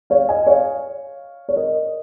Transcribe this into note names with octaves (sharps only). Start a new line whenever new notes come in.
C#5 F5
D#5 G#5
C#5 F5
C#5
A#4 D#5